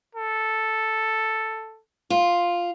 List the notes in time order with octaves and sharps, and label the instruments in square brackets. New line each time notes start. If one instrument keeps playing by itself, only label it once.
[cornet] A4
[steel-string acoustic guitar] F4